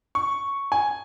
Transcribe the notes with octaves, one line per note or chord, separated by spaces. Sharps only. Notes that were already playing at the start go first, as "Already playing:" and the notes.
C#6
G#5